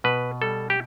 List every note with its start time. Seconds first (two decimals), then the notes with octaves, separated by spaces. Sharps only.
0.04 B2 B4
0.41 G3 A4
0.70 G4